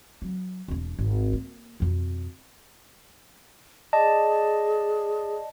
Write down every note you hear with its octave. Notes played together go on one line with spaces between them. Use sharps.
F#3
E1 D4
G#1
A#3
F2 B2
G#4 D5 D#5 A5